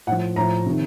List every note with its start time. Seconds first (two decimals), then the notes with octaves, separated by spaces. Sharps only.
0.07 A2 F3 F#5
0.36 A2 F3 A#5
0.66 C3 D#3